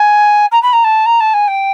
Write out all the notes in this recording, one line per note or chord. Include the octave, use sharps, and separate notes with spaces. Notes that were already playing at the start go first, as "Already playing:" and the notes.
Already playing: G#5
A#5
B5
A#5
A5
A#5
A5
G#5
G5